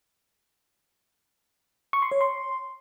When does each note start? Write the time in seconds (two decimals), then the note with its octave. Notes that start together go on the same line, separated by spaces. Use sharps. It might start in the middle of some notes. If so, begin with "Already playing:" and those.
1.93 C#6
2.02 C6
2.12 C#5
2.21 C6